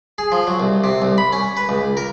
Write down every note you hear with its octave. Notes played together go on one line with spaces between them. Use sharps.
G#4
F3
F#3
C2
C3
C2
B5
C#4
B4
C#2
A#4